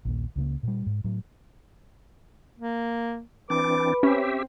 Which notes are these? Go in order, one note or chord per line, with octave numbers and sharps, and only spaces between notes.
A#1 D#2 A#2
C#2 C#3 A#3
A#2 G3
G#2
A2 F#3
A#3
E3 C4 D4 B4 D6
C4 C#4 G4 E5